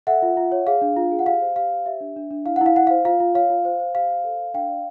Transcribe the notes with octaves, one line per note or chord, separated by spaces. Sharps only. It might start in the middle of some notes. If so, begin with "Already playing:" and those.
A4 E5 F#5
F4
F4
C#5
G#4 F5
D4
F4
G#4
F#5
G4 F5
C5
G4 F5
C5
G4 E5
D4
D4
D4
E4 F5
E4 F#5
F5
E4 F#5
C5 F5
F4 F5
F4
C#5 F5
F4
C5
C5
G4 F5
C5
A4
A4
D4 F5 G5
D5